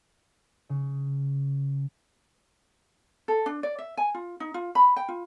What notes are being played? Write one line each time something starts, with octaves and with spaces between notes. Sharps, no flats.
C#3
A4
D4
D5
E5
G#5
F4
D#4
F4
B5
G5
F4